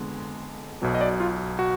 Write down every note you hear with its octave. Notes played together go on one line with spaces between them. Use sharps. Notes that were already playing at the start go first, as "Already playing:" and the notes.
Already playing: F2 D3 G#3 B3
B1 B2 F#3
D#5
D5
F4
F#4